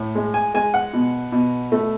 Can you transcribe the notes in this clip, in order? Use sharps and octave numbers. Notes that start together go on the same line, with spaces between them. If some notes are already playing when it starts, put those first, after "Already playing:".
Already playing: A2
G#3
G#5
G#3 G#5
F#5
B2
B2
A3